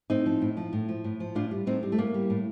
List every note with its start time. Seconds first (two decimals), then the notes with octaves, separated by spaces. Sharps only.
0.10 A2 C4 D#4
0.26 F3
0.42 A2
0.57 F3
0.73 A2
0.89 F3
1.04 A2
1.20 F3
1.35 A2 D4 F4
1.51 G3
1.67 A2 C4 D#4
1.83 G3
1.92 A3
1.98 A2 A#3
2.14 G3
2.30 A2